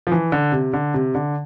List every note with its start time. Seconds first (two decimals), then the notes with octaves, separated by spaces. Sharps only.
0.07 F3
0.12 E3
0.32 D3
0.52 C3
0.73 D3
0.94 C3
1.15 D3